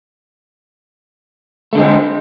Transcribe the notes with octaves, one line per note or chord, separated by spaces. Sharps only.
D3 G#3 A3 C4